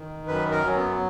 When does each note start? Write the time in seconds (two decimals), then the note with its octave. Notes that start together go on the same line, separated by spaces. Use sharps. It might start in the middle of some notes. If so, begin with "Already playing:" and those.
Already playing: D#3
0.27 F#2 B4
0.51 A#4
0.64 F#3 C#4
0.75 B3